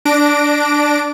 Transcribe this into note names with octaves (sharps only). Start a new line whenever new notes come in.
D4 A#6 D7